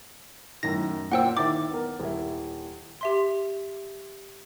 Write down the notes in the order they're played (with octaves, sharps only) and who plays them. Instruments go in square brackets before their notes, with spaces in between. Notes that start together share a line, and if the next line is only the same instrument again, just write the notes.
[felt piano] F#2 A2 D#3 [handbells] A#6
[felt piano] A#2 F4 C5 [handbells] F#5 G5 E6
[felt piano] D#3 E4 A6 [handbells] D6
[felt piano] B3 A#4
D#1 E4
[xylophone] G4 E5 C6